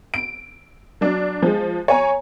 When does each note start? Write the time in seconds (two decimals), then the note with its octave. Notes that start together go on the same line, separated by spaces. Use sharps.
0.14 D7
1.01 F#3 D4
1.42 F3 G#3
1.88 C#5 G#5 A#5